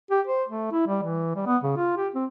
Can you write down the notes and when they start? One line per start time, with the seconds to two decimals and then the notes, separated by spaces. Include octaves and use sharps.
0.11 G4
0.27 C5
0.48 A3
0.71 E4
0.87 G3
1.03 E3
1.35 G3
1.47 B3
1.63 C#3
1.77 F4
1.97 G4
2.15 C4